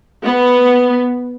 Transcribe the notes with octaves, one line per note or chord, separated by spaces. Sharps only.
B3